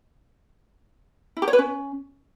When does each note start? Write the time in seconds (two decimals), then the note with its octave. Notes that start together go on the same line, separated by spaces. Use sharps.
1.37 E4
1.42 G4
1.48 C#5
1.53 B4
1.59 C#4